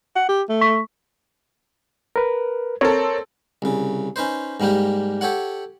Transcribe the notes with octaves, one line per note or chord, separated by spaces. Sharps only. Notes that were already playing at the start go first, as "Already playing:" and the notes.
F#5
G4
A3
C#6 B6
A#4 B4
C4 A4 A#4 C#5
C2 C#3
C#4 D#4 B4 C5
G#2 G3 A#3 G4
G4 A4 C#5 F#5